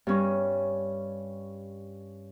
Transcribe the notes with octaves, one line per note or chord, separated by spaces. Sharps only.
G2 C#4